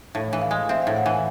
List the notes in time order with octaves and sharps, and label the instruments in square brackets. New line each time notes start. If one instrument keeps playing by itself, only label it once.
[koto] A2 [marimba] F5
[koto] E3
[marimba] F5
[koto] G#3
[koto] C4 [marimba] E5
[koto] A2 [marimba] F5
[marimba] F#5
[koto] E3 [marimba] G#5